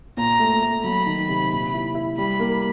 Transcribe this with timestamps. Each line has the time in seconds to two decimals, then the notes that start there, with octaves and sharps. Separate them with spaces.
0.17 A#2 A#5
0.39 A3
0.62 A3
0.84 F#3 B5
1.06 D#3
1.28 C3
1.51 A#2
1.74 E4
1.95 E4
2.17 G3 B5
2.39 A#3